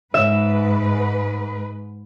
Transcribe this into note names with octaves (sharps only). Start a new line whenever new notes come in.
G#2 B4 E5